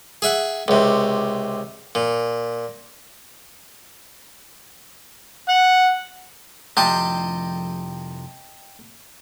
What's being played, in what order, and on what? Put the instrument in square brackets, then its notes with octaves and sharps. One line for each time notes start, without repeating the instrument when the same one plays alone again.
[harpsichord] G#4 E5 F#5
C#2 C3
A#2
[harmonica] F#5
[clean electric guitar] C2 F2 F3 [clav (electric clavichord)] C3 [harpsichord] D#5 G5 A5